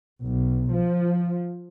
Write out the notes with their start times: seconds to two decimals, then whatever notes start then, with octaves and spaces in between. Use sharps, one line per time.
0.24 B1
0.73 F3